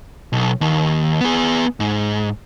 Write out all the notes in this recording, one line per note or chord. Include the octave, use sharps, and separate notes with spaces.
B1
D#2
B3 G#4
G#2